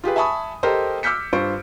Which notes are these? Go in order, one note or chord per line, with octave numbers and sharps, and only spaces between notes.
F4 G4 G#4 B4
E5 G#5 A5 B5 C#6 D#6
G4 A4 A#4 C5 D#5
D6 E6 F6 G6 B6 C#7
G2 F4 C5 C#6 D7